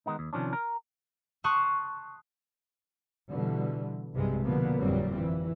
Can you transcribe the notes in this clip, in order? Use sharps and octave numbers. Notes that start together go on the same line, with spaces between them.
D#3 G#3 B3 D#4
D#2
C3 D#3 F3 C#4 D4
A#4
A5 C6 C#6 D#6 F#6
B2 D3 E3 G3
B1 G2 C3 G3 G#3
B2 D3 F3 A#3 B3
G1 F2 A#2 F#3 G3 C4
E3